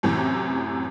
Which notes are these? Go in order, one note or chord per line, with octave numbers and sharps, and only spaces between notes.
F#2 A2 C3 E3